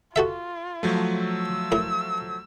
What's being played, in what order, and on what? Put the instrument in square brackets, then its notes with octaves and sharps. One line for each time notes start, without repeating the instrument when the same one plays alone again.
[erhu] F4 [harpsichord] F#4 A4 E5
[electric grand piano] F3 F#3 A3
[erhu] E6
[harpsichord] A2 A#4